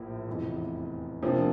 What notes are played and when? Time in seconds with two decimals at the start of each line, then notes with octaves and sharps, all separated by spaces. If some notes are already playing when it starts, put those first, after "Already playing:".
Already playing: A#1 A2 F3 A#3
0.27 F1 E2 E3
1.22 C3 F3 A#3 D4